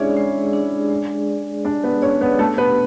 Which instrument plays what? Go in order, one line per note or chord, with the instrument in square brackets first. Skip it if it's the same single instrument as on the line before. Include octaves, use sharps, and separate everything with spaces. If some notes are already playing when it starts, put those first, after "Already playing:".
Already playing: [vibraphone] G#3 D4 G#4 D5 [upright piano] C#4 E4 C#5 E5
[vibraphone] G#3
D4 G#4 D5
G#3
D4 G#4 D5
[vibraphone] G#3 [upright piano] D4 D5
[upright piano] B3 B4
[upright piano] C#4 C#5 [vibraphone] D4 G#4 D5
[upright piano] B3 B4
[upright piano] A3 A4 [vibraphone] D4
[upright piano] B3 B4